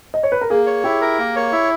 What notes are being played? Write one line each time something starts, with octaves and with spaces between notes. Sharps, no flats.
D#5
C#5
B4
A#4
A#3 G#4
C#5
E4 G4
A#4
A#3
C#5
E4